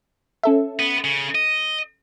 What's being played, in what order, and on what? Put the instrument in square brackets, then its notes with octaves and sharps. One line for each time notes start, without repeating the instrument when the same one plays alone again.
[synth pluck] C#4 A4 E5
[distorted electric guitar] B3
C#3
D#5